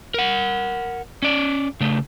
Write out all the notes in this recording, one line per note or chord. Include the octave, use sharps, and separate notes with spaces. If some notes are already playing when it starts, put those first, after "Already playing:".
A#4 F#5
C#4 D5
C#3 A3